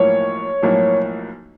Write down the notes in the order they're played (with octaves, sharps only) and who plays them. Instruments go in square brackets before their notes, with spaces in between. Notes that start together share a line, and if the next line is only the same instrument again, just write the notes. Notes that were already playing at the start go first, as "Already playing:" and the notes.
Already playing: [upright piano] B1 A2 F3 A#3 [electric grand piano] C#5
[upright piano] B1 A2 F3 A#3